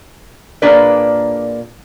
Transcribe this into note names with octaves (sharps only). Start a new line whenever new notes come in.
A#2 A#3 D4 G#4 B4 D5